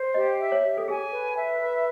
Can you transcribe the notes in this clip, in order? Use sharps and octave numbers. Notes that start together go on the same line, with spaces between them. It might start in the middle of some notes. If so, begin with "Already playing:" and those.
Already playing: C5
G4 D#5
E5
C#5
G4
A4
G#4 G#5
B4
E5
B4